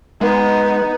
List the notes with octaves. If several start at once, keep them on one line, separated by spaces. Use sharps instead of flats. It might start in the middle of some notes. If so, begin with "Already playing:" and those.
G#3 B3 D#4